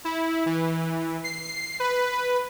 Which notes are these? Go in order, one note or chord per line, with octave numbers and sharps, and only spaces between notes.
E4
E3
C7
B4